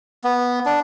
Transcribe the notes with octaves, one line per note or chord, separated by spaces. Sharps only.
B3
D4